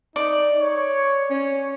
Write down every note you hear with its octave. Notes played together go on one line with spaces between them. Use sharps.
D#4 D5
C#5
C#4 C#5